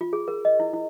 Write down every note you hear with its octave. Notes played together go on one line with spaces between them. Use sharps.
F4
G#4
A#4
D#5
E4
E4